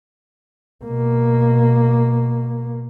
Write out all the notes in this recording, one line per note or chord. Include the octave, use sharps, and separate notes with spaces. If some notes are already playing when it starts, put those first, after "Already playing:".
B2 A#3